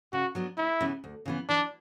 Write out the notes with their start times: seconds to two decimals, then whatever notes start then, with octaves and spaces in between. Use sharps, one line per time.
0.13 C#3 F#4
0.35 F#3 B3 D4
0.58 D2 E4
0.81 C#3 E3 B3
1.04 D2
1.26 C#3 E3 B3
1.49 E3 D4